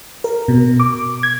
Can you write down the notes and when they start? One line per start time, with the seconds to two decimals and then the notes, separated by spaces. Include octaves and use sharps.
0.24 A#4
0.48 B2
0.80 D6
1.23 G#6